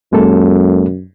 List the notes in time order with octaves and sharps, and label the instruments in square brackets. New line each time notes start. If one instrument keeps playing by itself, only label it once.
[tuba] F#2 [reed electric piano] G#3 A#3 A4